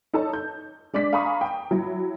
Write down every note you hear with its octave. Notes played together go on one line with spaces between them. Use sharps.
D#4 A4 C#5 A5
G6
G#3 D4 D6 B6
F5 G#5 A#5 B5 C#6 D#6
G5
F#3 E4